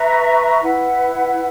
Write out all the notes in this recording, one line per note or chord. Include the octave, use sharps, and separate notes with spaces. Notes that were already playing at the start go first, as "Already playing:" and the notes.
Already playing: B4 E5 A#5 C#6
E4 B4 F#5